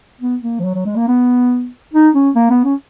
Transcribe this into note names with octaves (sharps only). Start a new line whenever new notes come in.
B3
A#3
F3
F#3
F#3
G#3
A#3
B3
D#4
C#4
A#3
B3
C#4